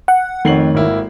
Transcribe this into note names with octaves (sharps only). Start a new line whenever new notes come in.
F#5
F2 D#3 A3 C#5 C7 F#7
G#1 A#3 E4